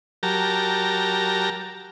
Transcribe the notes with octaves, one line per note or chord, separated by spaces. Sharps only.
F#3 G4 A#4 A5 A#5